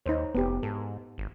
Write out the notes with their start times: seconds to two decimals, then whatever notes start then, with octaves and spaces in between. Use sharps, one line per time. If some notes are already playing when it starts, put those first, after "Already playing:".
0.06 D#2 D#4 C5 C#5
0.35 F1 B3 G4
0.63 G#2 A4
1.18 G#1